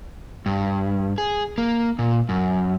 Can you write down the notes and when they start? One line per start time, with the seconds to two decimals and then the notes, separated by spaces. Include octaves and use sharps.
0.46 G2
1.18 G#4
1.58 A#3
1.99 A#2
2.29 F#2